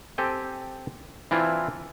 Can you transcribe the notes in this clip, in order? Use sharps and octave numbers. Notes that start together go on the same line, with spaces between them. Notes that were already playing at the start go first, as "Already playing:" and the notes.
C4 G4 A4 G5 G#5
E3 C4 D4 E4 F4